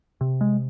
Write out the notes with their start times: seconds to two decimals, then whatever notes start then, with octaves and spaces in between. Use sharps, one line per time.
0.21 C3
0.41 G#3